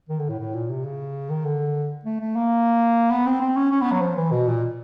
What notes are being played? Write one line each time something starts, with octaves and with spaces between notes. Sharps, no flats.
D#3
D3
A2
A2
A#2
C3
C#3
D#3
D3
A3
A3
A#3
B3
C4
C4
C#4
C#4
B3
F#3
F3
E3
B2
A#2